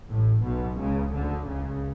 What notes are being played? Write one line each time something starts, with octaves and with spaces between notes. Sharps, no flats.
A1 A2
B1 B2
C#2 C#3
D2 D3
C#2 C#3